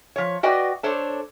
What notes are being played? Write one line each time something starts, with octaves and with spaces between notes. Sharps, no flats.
F3 C#5
F#4 B4 D5 D#5 G5
D4 A4 C5 C#5